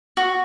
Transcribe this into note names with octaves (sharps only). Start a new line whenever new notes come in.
F#4